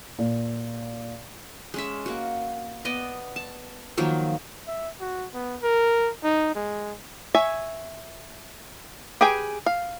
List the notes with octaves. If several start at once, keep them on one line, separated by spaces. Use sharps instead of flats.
A#2
G#3 C#4 E5
A#3 F#4
B3 D5 D#5
A5
D#3 F3 F#3 A#3
E5
F#4
B3
A#4
D#4
G#3
C#5 E5 G#5
G4 G#4 B4 G5 G#5
F5